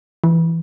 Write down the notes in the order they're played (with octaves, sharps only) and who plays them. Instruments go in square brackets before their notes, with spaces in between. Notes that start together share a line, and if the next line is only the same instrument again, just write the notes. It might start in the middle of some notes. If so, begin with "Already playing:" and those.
[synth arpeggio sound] E3